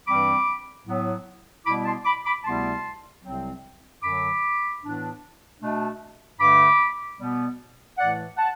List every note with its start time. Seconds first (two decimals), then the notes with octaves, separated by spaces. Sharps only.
0.07 G2 E3 G3 C4 B5 D6
0.86 A2 F#3 B3
1.66 B2 G3 B3 E4 B5 D6
1.85 A5 C6
2.05 B5 D6
2.25 B5 D6
2.45 D2 C3 G3 B3 E4 A5 C6
3.24 C2 C3 F#3 C4
4.02 F#2 D3 F#3 B5 D6
4.82 A2 E3 B3 D4
5.61 B2 A3 D4
6.39 G2 D3 A3 B5 D6
7.18 B2 G3 B3
7.97 A2 E3 A3 D5 F#5
8.37 F#5 A5